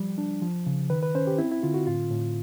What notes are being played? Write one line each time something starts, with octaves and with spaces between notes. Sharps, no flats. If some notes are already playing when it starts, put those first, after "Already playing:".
Already playing: F3 G3
D4
F3
C#3
D#3 B4
B4
C#4 C5
G4
C4 E4
E4
D3 F4
F#4
A2 F4
A2